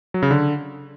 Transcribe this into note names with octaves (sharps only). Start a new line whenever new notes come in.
F#3
C#3
D3